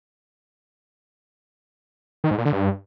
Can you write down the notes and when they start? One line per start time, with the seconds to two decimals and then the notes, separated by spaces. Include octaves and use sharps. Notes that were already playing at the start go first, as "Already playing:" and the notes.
2.24 D#3
2.31 G#2
2.38 A#2
2.45 D3
2.53 G2